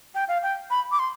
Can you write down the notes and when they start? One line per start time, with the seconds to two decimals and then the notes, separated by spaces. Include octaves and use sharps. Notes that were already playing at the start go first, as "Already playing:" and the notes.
0.15 G5
0.28 F5
0.43 G5
0.70 B5
0.92 D6
0.99 C6